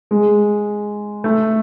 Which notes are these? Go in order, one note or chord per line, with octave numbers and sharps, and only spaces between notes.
G#3
A3